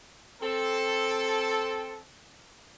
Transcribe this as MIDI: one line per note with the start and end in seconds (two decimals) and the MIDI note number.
0.42 2.00 60
0.42 2.00 69